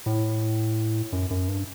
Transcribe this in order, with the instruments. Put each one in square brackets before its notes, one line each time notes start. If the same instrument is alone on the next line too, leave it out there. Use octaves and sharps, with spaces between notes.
[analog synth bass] A2
F#2
F#2
G2